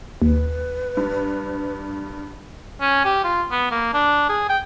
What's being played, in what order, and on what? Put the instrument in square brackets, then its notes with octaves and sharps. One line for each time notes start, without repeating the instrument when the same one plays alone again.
[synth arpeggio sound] D#2 [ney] B4
[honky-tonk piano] G2
[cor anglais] C#4
G4
F4
B3
A#3
D4
G#4
G5